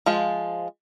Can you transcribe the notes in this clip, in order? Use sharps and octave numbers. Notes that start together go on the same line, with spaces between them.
F3 G#3 F4